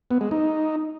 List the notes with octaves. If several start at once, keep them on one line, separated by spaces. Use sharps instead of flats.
B3
G#3
D#4